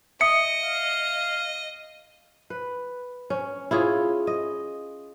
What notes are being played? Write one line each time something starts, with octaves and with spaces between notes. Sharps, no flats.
D#5 E5 D#6 C#7
F5
B4
C#4
E4 F4 G#4 C#5
D#5